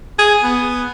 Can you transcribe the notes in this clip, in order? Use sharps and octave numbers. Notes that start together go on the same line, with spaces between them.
G#4
B3